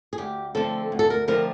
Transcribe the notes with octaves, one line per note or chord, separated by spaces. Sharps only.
G#4
D2 G4
D3 F3 A3 C4 A4
D2
A4
A#4
D3 F3 A3 C4 A#4